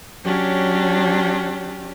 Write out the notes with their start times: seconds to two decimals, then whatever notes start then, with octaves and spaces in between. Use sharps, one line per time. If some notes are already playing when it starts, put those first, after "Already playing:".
0.25 F#3 C#4 D4 G4